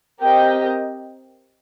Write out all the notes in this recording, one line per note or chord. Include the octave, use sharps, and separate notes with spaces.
C4 G4 A#4 D#5 G5